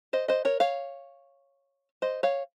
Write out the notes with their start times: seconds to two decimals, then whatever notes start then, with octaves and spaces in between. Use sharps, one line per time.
0.13 C5 D#5
0.28 C5 D#5
0.45 A#4 C#5
0.60 C#5 F5
2.02 C5 D#5
2.23 C#5 F5